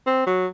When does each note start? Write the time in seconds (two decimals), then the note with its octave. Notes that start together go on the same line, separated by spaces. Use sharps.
0.07 C4
0.26 F#3